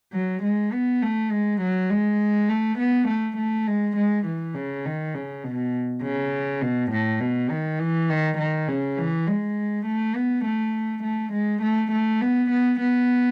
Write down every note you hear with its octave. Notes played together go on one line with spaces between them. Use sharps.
F#3
G#3
B3
A3
G#3
F#3
G#3
A3
B3
A3
A3
G#3
G#3
E3
C#3
D#3
C#3
B2
C#3
B2
A2
B2
D#3
E3
D#3
D#3
C#3
E3
G#3
A3
B3
A3
A3
G#3
A3
A3
B3
B3
B3